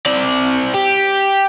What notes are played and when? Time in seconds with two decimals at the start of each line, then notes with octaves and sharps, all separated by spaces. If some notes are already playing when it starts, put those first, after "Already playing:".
0.06 C4 D5
0.75 G4